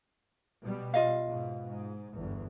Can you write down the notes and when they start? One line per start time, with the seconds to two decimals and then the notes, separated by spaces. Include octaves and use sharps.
0.61 B2 G3
0.94 F4 D#5 F5
1.26 G#2 B2
1.66 G#2
2.12 G1 E2